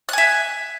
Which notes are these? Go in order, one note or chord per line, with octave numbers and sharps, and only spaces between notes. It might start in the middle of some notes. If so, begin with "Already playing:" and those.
E5 G#5 F#6